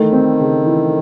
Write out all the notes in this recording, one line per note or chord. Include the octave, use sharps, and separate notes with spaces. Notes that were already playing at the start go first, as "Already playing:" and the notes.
Already playing: D#3 E3 A3
C4
C#3
E3